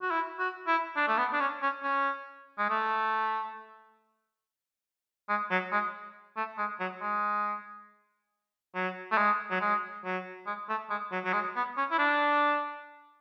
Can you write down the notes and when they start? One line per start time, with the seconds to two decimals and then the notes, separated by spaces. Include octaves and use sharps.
0.02 F#4
0.11 E4
0.39 F#4
0.67 E4
0.97 D4
1.08 A3
1.18 B3
1.33 D4
1.40 C#4
1.62 C#4
1.83 C#4
2.59 G#3
2.70 A3
5.29 G#3
5.51 F#3
5.72 G#3
6.37 A3
6.58 G#3
6.80 F#3
7.02 G#3
8.75 F#3
9.12 A3
9.18 G#3
9.51 F#3
9.61 G#3
10.05 F#3
10.47 G#3
10.69 A3
10.90 G#3
11.12 F#3
11.25 F#3
11.33 G#3
11.56 B3
11.77 C#4
11.91 E4
11.98 D4